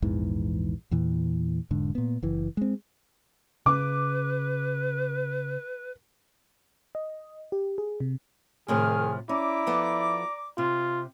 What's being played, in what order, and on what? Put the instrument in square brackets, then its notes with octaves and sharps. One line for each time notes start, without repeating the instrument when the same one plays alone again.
[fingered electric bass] A#1 E2 G#2 E3
E2 A#2 E3
E1 G#2 D3
A#2 B3
F#1 E3
G#3 C4
[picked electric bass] C#3 [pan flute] B4 [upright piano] D6
[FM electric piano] D#5
G4
G#4
C3
[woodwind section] C2 D#3 F6 [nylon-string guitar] A2 C3 F3 [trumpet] G#4
[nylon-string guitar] C#4 [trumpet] E4 [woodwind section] D5 A#5 D6
[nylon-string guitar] F3 B3 A4
[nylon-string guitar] C3 [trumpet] F4